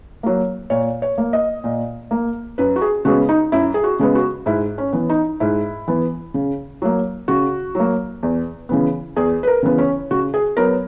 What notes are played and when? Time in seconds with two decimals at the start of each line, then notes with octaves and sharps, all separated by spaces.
0.23 F#3 A#3
0.70 A#2 C#5
1.02 C#5
1.18 A#3
1.33 D#5
1.64 A#2
2.11 A#3
2.58 F#2 B4
2.76 F#4
2.82 G#4
3.05 C#3 G#3 B3 F#4
3.29 D#4
3.52 F#2 E4
3.74 G#4
3.84 F#4
3.99 C#3 G#3 B3
4.15 F#4
4.46 G#2 E4
4.78 C#4
4.93 E3 B3
5.09 D#4
5.40 G#2 E4
5.88 E3 B3
6.34 C#3
6.82 F#3 A#3
7.28 C#3 F#4
7.75 F#3 A#3
8.23 E2
8.69 C#3 E3 B3
9.16 E2 G#4
9.43 B4
9.47 A#4
9.63 C#3 E3 B3
9.78 C#4
10.11 C#3 F#4
10.34 G#4
10.57 F#3 B3 A#4